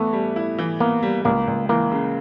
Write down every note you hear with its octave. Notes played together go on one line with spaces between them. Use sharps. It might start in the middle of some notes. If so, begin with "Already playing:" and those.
Already playing: E3 A3 B3
G3
E4
E3
A#3 B3
G3
C#2 A#3
C#2
E3 A#3
C#3